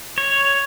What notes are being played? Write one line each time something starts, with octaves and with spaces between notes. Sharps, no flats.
C#5